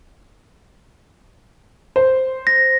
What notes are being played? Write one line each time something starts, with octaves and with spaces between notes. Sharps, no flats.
C5
A#6